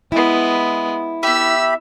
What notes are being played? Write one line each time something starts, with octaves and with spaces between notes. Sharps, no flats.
G#3 B3 E4
B3 G4 E5 B5 E6